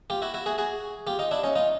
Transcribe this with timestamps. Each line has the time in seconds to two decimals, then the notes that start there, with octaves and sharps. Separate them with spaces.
0.10 F4 G4
0.22 E4 F#4
0.34 E4 F#4
0.46 F#4 G#4
0.58 F#4 G#4
1.07 F4 G4
1.19 D#4 F4
1.31 D4 E4
1.43 C#4 D#4
1.55 D#4 F4